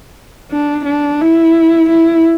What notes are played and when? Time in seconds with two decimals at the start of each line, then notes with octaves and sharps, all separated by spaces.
0.51 D4
0.85 D4
1.21 E4
1.89 E4